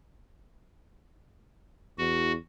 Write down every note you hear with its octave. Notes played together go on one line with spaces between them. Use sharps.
E2 F#4